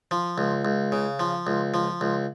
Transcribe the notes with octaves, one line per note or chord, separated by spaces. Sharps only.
F3
C#2
C#2
C#3
F3
C#2
F3
C#2